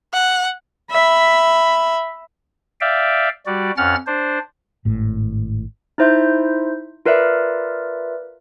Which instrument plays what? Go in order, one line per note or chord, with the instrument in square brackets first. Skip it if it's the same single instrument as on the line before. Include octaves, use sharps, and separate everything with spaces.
[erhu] F#5
[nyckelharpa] E5 B5
[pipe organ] D5 E5 F5 G5
G3 F#4 D5
F2 C#4 F#5 F6 A6
D4 C5
[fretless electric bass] G#1 A2
[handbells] D#4 E4 C5 E5 C6 G6
F4 A#4 B4 D5 E5